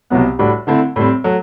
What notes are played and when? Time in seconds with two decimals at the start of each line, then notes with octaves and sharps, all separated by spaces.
0.10 C2 B2 F#3 B3
0.39 A2 G3 D4 F#4
0.67 D3 A3 C4 E4
0.96 A2 G3 C4
1.24 F#3 A3